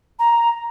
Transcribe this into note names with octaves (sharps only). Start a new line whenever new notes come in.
A#5